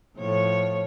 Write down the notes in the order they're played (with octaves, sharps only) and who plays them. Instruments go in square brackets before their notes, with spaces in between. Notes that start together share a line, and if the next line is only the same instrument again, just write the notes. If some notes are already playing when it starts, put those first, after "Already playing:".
[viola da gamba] A2 F3 C#5